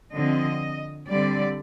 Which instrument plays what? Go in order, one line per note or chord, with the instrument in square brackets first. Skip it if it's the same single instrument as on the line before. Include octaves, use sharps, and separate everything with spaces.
[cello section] D3 F3 C4 D#5
D3 G3 C4 D5